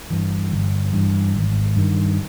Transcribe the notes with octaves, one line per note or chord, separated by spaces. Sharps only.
G2 E3
G1
G2 E3
G#1
G2 D#3